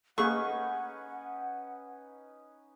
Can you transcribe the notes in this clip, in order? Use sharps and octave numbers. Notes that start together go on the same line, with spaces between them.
A#3 C#4 D#4 G#4 A4 B4 F#5 C#6